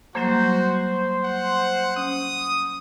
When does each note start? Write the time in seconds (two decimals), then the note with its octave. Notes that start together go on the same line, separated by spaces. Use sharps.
0.15 F#3 G3 A#3 F#4 C5
1.24 F#5
1.97 C#4 D#6